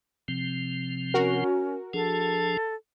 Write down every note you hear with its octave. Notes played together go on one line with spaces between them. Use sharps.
C3 F3 C4
C#4 F#4 A#4
F3 D4 G#4 A4